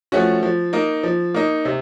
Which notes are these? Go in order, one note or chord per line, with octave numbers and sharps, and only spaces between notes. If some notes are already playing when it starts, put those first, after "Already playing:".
F3 A3 C#4 F#4
F3
A#3 D#4
F3
A#3 D#4
C3